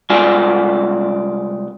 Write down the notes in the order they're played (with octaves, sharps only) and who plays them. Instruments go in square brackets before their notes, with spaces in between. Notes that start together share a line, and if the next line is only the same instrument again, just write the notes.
[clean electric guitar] C2 G#3 F4 D5 G#5